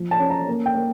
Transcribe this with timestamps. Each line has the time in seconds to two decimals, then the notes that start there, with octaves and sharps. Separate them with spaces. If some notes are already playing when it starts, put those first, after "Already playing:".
Already playing: F3
0.11 A5
0.20 C#4
0.30 A#5
0.48 A#3
0.66 G5
0.75 A#3